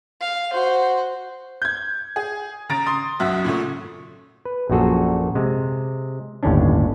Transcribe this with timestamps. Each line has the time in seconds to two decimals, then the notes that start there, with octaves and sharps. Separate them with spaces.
0.21 F5
0.53 F#4 C5
1.62 G6 G#6
2.16 G#4
2.69 C#3 A#5 A6 D7
2.86 C6 D#6
3.19 B1 F#2 F#4 E5
3.44 A#2 C#3 A3
4.45 B4
4.70 A#1 F#2 A#2 F#4 G#4 A4
5.35 C3 G#3
6.43 G1 D#2 A2 C#4 D4